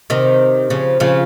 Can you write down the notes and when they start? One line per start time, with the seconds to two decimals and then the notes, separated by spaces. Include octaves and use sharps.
0.10 C3 D#3
0.70 C#3 F3
1.00 C#3 F3